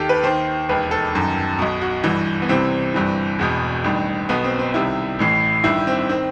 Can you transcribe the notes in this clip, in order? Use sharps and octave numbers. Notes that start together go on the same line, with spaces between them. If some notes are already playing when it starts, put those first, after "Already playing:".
Already playing: D#2 D#3 G4 A4
B4
D#2 D#3 C5
E1 D#2 D#3 B4
A4
G1 F#2 D#3
B1 B2
F#4
G1 G2 E3
B3
C2 C3 E3 C4
G1 G2 E3
E1 E2 B2
A1 G2 D#3
B1 B2 B3
C4
C4
C2 C3 D#3 E4
A1 A2 E3
G1 G2 D#3 E4
C4
D#3 C4